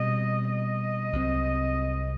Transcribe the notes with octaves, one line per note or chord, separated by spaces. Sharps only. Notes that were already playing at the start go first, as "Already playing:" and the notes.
Already playing: B2 G3 C4 D#5
D#5
C2 C3 F#3 C4